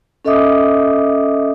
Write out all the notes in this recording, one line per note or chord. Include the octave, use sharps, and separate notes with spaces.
C#4 A4 D#5 E5 D6 D#6